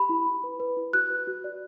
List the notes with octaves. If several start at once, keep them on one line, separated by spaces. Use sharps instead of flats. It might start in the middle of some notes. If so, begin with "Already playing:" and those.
Already playing: G4 B5
E4
E4
B4
B4
E4
F#4 F#6
B4
F#4
D5